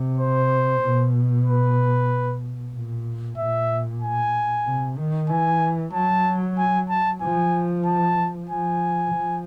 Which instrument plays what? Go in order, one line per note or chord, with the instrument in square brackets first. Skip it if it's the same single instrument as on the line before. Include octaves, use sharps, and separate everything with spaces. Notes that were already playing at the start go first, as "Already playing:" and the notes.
Already playing: [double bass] C3
[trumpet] C5
[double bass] B2
[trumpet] B4
[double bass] A#2
[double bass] A#2 [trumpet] E5
[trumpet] G#5
[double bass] C3
D#3
[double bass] E3 [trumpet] G#5
[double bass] F#3 [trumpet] A5
[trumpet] G#5
A5
[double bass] F3 [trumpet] G#5
[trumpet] A5
[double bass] F3 [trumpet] G#5
[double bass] F3